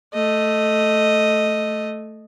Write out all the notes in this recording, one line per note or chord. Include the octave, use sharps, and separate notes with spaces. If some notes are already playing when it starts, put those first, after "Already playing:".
A3 D#5